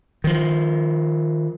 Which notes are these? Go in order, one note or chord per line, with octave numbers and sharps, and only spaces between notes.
D#3 F3